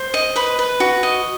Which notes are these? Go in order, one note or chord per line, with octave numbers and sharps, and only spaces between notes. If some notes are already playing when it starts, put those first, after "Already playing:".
Already playing: C5
D#5
B4 B5
B4
F#4
D#5